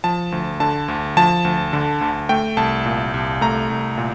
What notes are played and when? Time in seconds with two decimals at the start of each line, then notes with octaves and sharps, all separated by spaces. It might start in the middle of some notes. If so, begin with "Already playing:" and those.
0.04 F3 A5
0.32 D2
0.60 D3 A5
0.88 D2
1.17 F3 A5
1.45 D2
1.73 D3
2.01 D2
2.29 A3 G5
2.57 C2 A5
2.85 A#2
3.14 C2
3.41 A3 A#5
3.70 C2
3.98 A#2